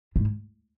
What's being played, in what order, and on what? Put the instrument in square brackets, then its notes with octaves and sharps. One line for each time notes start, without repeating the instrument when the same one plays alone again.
[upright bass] G#2